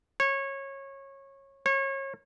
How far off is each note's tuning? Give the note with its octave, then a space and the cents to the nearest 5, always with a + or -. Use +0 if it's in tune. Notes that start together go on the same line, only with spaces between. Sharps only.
C#5 -20
C#5 -30